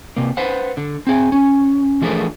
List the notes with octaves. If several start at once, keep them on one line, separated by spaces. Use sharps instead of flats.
C3 A#3
B4 C5 F#5
D3
C4 G#4
C#4
E3 F3 A3 D4 G#4 A#4